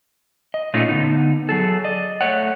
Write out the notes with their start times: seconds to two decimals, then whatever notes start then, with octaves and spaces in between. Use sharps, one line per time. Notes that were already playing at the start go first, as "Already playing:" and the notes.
0.54 D#5
0.74 A#2 A3 C#4 D#4 F4
0.89 D3 B3 D#4
1.49 F#3 G#4 A4
1.84 D5 D#5
2.21 A3 C#5 F#5